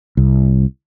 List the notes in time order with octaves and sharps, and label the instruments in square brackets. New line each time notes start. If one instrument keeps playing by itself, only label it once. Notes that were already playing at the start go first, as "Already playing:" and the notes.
[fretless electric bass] C2